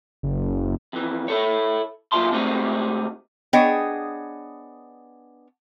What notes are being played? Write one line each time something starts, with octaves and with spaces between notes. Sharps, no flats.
F#1
F2 E3
E4 A4 C#5
A#2 F#3 F4 E5 A5 C6
C3 G#3 A3 C4 D#4 F#4
B3 D4 G#4 C#5 D#5 G5